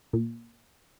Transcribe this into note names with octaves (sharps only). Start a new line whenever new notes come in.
A#2